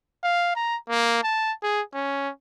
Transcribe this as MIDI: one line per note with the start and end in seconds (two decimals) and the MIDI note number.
0.24 0.52 77
0.56 0.77 82
0.89 1.23 58
1.23 1.52 81
1.63 1.81 68
1.94 2.30 61